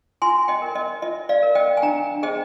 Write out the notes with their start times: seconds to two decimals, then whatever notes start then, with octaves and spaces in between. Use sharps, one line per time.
0.22 F4 G#5 C6
0.48 D#5 G5
0.62 A#4
0.75 D#5
1.02 F4 D#5
1.29 D5 F5
1.43 A#4
1.55 D#5 G5
1.77 G#5
1.82 D4 G5 A#5
2.23 G#4 C5 D#5 G5